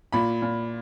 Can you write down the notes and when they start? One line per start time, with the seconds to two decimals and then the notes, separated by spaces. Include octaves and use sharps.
0.13 A#2 B5
0.42 A#2